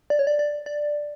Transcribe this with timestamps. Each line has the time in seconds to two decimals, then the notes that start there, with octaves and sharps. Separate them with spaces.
0.10 D5
0.19 C#5
0.27 D5
0.39 D5
0.66 D5